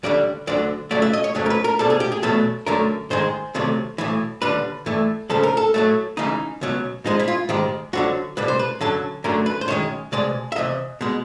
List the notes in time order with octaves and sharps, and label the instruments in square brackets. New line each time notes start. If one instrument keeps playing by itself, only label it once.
[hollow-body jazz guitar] D#2 D3 G3 D5
D2 D3 F#3 D5
F2 C#3 F#3 A3 D5
E5
D#5
C#5
F2 C#3 F#3 A3
A#4
B4
A#4
C2 B2 G3 A4
G#4
G4
G#4
E2 B2 F#3 A3 A4
F#2 D3 F#3 A3 A#4
G#2 D#3 G#3 C5
C2 C3 D#3 F#3 A3
B1 A2 E3
D#2 D3 G3 B4
G2 E3 A3
C#2 C#3 F3 A4
A#4
A4
A2 F#3 A3
C#2 C#3 E3 D#4
C#2 B2 F#3
G#2 F3 G#3 D#4
E4
F4
G#2 D#3 G#3 G4
F2 D3 F#3 F#4
C2 B2 G3 B4
C5
B4
F#2 D3 F#3 A4
F#2 D3 F#3 A3 A#4
B4
C5
F#2 D#3 G#3 C#5
C2 B2 G#3 D5
E5
E2 C3 D#5
B2 G#3